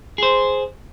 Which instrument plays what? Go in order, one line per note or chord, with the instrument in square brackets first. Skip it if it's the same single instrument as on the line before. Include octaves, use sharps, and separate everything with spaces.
[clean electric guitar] G#4 C5